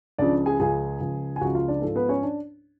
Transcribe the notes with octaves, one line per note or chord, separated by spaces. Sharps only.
C#2 C#3 F3 D4 D5
G#4 G#5
C#2 C#3 F3 G#4 G#5
C#2 C#3 F3
G#5
C#2 C#3 F3 F#4 F#5
F4 F5
D4 D5
G#2 F3 A4
B3 B4
C#4 C#5
D4